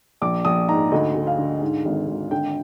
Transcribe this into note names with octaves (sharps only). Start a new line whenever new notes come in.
A#1 D6
A#1 D#6
G#2 A#5
D2 D#5
D2
F5
D3
G#2
G#1
G#1
D3 G5